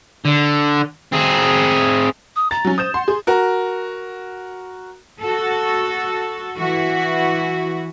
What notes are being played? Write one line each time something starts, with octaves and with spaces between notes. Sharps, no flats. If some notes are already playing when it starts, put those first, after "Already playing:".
D3
C4 G#4
D#6
A#5 A6
F#3 C#4
C5 D#6 G6 E7
F#5 C6
G#4 C6
F#4 A#4
F#4 A4
E3 F#4